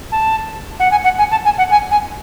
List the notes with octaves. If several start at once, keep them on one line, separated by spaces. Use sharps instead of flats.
A5
F#5
G#5
F#5
G#5
A5
G#5
F#5
G#5
G#5